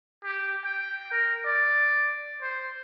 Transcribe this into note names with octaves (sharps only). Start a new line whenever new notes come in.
G4
G5
A#4
D5
C5